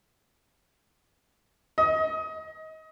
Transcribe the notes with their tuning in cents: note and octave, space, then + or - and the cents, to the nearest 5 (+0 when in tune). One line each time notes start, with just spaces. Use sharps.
D#5 +25